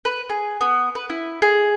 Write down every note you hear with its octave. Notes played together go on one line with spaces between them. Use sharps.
B4
G#4
B3
B4
E4
G#4